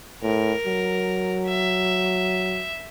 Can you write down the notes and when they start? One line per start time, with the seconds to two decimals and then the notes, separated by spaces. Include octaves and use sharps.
0.23 A2 A#4
0.66 F#3
1.47 E5